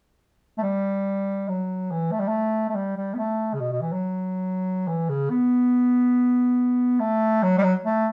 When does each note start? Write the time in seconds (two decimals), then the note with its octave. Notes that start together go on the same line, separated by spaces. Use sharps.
0.58 A3
0.63 G3
1.48 F#3
1.91 E3
2.11 A3
2.20 G3
2.28 A3
2.69 A3
2.75 G3
2.97 G3
3.14 B3
3.18 A3
3.54 C#3
3.60 B2
3.71 B2
3.81 E3
3.92 F#3
4.87 E3
5.09 C#3
5.30 B3
7.00 A3
7.43 F#3
7.58 G3
7.63 F#3
7.85 A3